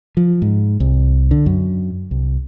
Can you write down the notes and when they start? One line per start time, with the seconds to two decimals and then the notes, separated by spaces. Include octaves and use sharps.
0.17 F3
0.42 G#2
0.80 C2
1.31 D3
1.46 F#2
2.11 C2